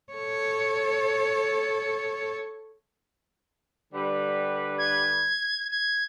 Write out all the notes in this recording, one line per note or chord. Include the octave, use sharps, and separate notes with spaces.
A4 C#5
D3 G3 B4
G#6
G#6